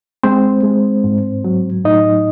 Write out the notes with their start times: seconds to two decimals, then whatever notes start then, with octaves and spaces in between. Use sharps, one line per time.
0.23 G#3 C4 C5
0.63 G#3
1.04 G#2
1.44 F#3
1.84 A2 D#4 D#5